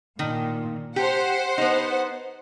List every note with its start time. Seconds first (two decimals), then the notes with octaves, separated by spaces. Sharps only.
0.19 A#2 D#3
0.96 G4 C5 F#5
1.58 B3 D#4